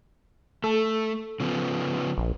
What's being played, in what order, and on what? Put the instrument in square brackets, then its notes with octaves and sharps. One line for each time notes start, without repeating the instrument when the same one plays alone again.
[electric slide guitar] A3 [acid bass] A4
[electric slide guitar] C#3 F3 B3
[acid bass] A#1